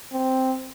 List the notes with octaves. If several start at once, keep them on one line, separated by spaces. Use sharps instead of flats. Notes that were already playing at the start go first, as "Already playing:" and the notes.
C4